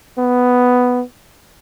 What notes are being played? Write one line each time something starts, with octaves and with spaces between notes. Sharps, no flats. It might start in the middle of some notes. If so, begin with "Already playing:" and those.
B3